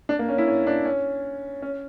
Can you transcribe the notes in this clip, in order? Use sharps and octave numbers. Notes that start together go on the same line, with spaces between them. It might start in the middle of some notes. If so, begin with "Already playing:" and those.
D4
A#3
C#4
E4
C#4
D4
C#4
C#4